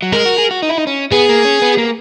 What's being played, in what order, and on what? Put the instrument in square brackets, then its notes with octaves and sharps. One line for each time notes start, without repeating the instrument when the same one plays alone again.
[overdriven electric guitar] F#3
[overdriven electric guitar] G#3 [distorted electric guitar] A#4
[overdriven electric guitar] F#4
G#4
F#4
D#4
E4
D#4
C#4
[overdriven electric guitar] B3 [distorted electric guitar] G#4
[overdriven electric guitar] A#3
C#4
B3
A#3